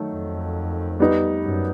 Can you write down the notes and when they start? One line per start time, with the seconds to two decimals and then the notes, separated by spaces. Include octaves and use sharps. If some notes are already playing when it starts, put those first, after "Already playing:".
Already playing: D#3 F#3 A3
0.13 F2
1.00 G3 B3 D#4
1.43 F#2